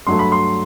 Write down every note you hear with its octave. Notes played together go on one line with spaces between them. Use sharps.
G2 F#3 A3 C6
B5
C6